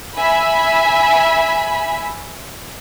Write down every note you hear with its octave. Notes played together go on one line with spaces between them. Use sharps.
E5 G#5 B5